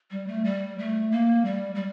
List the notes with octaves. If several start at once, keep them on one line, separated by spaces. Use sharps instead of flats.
G3
A3
G3
A3
A#3
G3
G3